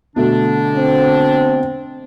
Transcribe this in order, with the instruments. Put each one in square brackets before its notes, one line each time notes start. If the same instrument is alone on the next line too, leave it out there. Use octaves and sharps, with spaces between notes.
[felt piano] B2 A3 [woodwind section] D3 D4
[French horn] C4